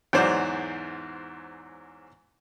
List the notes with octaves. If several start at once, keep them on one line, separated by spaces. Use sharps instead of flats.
E2 G#2 F#3 C5 D5